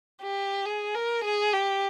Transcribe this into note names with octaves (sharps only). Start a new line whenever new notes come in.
G4
G#4
A#4
G#4
G4